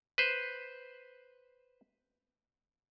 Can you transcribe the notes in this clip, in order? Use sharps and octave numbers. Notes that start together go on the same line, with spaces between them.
B4 C5